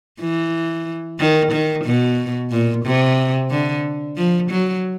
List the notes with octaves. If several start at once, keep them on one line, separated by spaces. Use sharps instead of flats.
E3
D#3
D#3
B2
A#2
C3
D3
F3
F#3